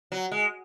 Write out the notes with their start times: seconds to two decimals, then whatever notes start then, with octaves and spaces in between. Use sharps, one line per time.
0.12 F#3
0.31 G#3